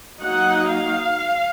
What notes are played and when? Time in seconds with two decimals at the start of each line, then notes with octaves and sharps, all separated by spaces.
0.21 F#3 A#3 D#4 F#5
0.71 F5